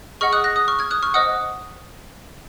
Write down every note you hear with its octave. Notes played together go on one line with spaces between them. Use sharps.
G#4 D#5 F#5 C#6 F6
D#6 F#6
F#6 A#6
D#6 F#6
C#6 F6
F6 G#6
D#6 F#6
C#6 F6
C5 D#5 F#5 D#6 F#6